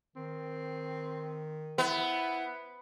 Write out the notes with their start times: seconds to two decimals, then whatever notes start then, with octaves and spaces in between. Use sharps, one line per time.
0.16 D#3 C4
1.78 B3 E4